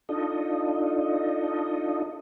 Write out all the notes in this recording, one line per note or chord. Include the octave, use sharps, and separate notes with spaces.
D4 D#4 F4 A4 D#5